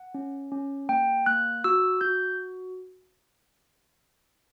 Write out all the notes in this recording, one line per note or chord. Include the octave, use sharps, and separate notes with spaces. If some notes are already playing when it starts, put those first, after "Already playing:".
Already playing: F#5
C#4
C#4
A#3 G5
A#3 F#6
F#4 E6
F#4 G6